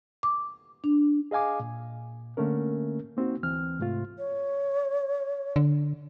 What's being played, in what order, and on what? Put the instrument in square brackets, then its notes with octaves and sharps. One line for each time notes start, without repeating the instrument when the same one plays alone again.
[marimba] D6
D4
[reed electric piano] G#4 D#5 F5 G#5 D6
A#2
D3 A3 A#3 C#4 A#4
A#3 C4 D#4 F#4
D2 E3 C4 F6
G#2 C3 A3 F4
[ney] C#5
[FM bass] D3